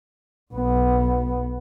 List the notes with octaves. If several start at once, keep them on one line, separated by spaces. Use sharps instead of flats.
B1 B3